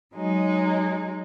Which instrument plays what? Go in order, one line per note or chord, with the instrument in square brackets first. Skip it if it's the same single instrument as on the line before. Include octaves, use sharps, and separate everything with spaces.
[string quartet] F#3 G#3 D#4